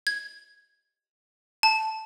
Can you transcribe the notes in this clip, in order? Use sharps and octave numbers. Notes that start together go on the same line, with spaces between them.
G#6
A5